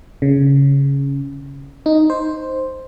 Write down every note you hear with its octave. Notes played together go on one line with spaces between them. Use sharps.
C#3
D#4
C5